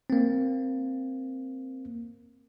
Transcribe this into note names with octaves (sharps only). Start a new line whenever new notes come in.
A#3 C4